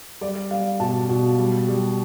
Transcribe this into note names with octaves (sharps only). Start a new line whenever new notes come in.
G3 D5
G3 F5
B2 A5
B2
G3
G3